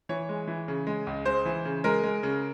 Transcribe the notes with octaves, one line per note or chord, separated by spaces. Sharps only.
E3 C#5
G#3
E3
C#3
G#3
C#2
G#3 C5
E3
C#3
G#3 A#4
G#3
C#3